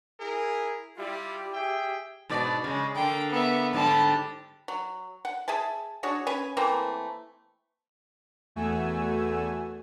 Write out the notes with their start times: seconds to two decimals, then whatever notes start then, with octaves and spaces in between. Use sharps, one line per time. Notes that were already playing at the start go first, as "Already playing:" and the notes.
0.20 E4 G#4 A#4
0.96 G3 E4 F4 G4
1.53 G#4 E5 G5
2.30 G#2 B2 D5
2.64 C#3 G#3
2.95 D3 A#3 G5
3.30 B3 E5
3.73 G#2 D3 G3 A5 B5
4.68 F#3
5.25 F#5
5.48 G#4 E5 G#5 A5
6.03 D4 F#4 G#4 C#5
6.27 C#4 B4 G#5
6.57 E3 A3 A#3 C4
8.56 E2 A3 F#4 G#5 E6